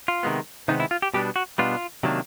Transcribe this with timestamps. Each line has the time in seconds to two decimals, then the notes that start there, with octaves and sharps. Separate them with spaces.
0.08 F4
0.23 C3 D#3 G#3 B3
0.68 C3 D#3 G#3 B3 D#4
0.80 E4
0.91 F4
1.02 G4
1.14 B2 G3 B3 D4 G4
1.36 F#4
1.58 B2 G3 B3 D4 F4
2.03 C3 D#3 F#3 A#3 D4